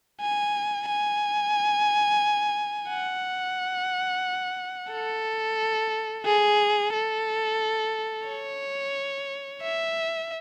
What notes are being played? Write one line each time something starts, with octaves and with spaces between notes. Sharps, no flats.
G#5
G#5
F#5
A4
G#4
A4
C#5
E5